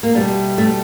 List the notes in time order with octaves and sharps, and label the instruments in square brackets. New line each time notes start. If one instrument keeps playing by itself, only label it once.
[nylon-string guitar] A#3
B2 G3 A3
A3